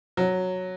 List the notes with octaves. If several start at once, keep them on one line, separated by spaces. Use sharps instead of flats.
F#3